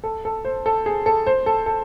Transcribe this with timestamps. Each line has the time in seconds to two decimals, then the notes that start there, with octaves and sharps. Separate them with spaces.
0.04 A4
0.25 A4
0.45 C5
0.66 A4
0.86 G#4
1.06 A4
1.26 C5
1.46 A4
1.66 A4